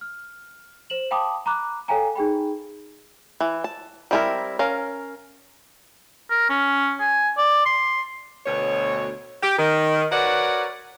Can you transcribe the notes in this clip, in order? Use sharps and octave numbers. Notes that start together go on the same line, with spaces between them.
F6
C5 E7 F#7
F5 G5 A5 B5 D6 D#6
A#5 B5 D6 F#6
A4 C#5 F5 G5 G#5 A#5
D#4 G#4 G5 B5
E3
A5
G3 C4 E4 A4 A#4
C#4 A#4 F5
A#4
C#4
G#5
D5
C6
D2 B2 C#5
G4
D#3
F#4 A#4 B4 C#5 D5 F#5